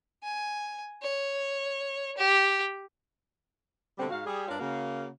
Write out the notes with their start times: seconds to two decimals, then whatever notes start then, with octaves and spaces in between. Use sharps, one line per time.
0.23 G#5
1.02 C#5
2.18 G4
3.98 B2 D3 G3 A3 C4
4.10 G#2 F#4 F5
4.26 G3 G#4
4.48 G2 D4 F4 A#4 C#5 F5
4.60 C#3 A#3 F#4